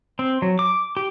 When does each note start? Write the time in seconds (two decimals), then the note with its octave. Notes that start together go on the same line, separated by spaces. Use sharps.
0.19 C4
0.42 F#3
0.59 D6
0.97 G4